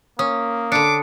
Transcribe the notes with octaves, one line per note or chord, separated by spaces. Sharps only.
A#3 C#4 D#6
D3 D4 D6 C#7